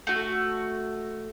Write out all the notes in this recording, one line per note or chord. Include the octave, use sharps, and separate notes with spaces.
A3 F#4